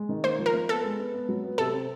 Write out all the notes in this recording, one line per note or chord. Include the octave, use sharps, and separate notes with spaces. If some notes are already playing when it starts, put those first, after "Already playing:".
Already playing: G#3
D#3
A#3 C5
F3
A#4
A#3
B3 A4
G#3
B3
B3
F#3
B3
C3 A4
C4